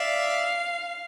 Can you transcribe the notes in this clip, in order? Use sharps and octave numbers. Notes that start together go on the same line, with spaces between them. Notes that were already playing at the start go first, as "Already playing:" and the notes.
Already playing: D5 E5 F5